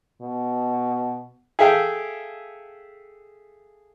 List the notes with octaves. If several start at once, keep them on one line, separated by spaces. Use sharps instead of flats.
B2
G#4 A4 E5 F5 G5